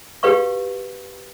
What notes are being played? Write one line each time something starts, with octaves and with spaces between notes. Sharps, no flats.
F#4 G4 B4 F5 C#6